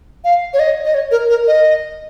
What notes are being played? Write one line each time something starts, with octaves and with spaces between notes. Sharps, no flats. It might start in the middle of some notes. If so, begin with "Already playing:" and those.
F5
C#5
D#5
D#5
C#5
A#4
A#4
D#5